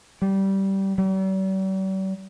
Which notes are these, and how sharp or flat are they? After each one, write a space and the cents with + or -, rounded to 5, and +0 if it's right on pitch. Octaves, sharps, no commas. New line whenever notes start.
G3 -15
G3 -45